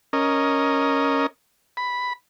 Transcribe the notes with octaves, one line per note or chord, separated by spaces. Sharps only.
C#4 A#4 D#5
B5